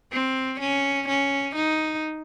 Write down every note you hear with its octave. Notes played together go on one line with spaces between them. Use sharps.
C4
C#4
C#4
D#4